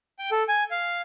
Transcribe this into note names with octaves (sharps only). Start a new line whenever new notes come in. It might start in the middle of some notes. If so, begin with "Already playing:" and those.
G5
A4
G#5
F5